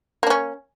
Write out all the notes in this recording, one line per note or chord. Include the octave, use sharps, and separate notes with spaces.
A#3 C#4 D4